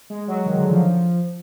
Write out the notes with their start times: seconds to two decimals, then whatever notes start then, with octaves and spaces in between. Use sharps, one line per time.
0.10 G#3
0.28 F#3
0.46 D#3
0.57 D3
0.70 F3